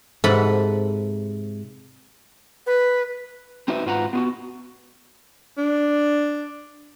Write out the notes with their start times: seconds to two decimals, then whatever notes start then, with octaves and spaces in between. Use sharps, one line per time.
0.24 G#2 C3 A4 B4 F#5 B5
2.67 B4
3.68 C4 D#4 F#4 B4 E5
3.86 G#2 F4 B4 F#5 A5 A#5
4.13 B3 F4 F#4
5.58 D4